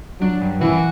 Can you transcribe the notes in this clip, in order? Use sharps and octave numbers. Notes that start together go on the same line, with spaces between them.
F#3 D4
G2
E3 F#4